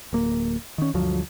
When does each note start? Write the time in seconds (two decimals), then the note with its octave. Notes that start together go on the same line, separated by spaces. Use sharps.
0.13 D1 A#3
0.78 D#3 C#4
0.94 D2 G2 F3 F#3